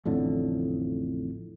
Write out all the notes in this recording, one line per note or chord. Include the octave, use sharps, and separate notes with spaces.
A1 F2 A2 D3